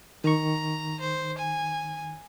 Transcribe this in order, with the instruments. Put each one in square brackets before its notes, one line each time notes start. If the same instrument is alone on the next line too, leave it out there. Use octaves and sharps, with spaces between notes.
[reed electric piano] D#3 C#6 [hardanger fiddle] A#5
[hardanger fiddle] C5
G#5